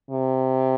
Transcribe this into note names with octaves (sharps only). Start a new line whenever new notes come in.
C3